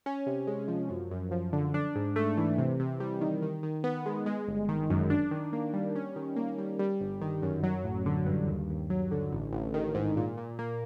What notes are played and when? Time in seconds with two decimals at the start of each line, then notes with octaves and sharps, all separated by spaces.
0.06 C#4
0.26 C3
0.47 G#3
0.68 F3
0.90 F#2
1.11 F#2
1.31 F3
1.53 D3
1.74 D4
1.96 G#2
2.16 A3
2.37 E3
2.58 C3
2.80 C3
3.00 G3
3.21 D#3
3.42 D#3
3.63 D#3
3.84 B3
4.06 G#3
4.26 G#3
4.48 G1
4.68 D#3
4.90 F#2
5.10 D4
5.31 D#3
5.53 A#3
5.73 G3
5.95 C#4
6.16 D#3
6.36 A#3
6.58 G3
6.79 G3
7.00 G1
7.21 D#3
7.42 F#2
7.63 F#3
7.84 A1
8.06 D3
8.26 G2
8.48 D#2
8.69 D#2
8.90 F#3
9.11 D3
9.32 A1
9.53 A1
9.74 D#3
9.95 G#2
10.17 A#2
10.38 A#2
10.59 A#3